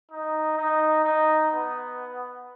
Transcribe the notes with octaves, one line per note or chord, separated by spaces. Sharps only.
D#4
D#4
D#4
B3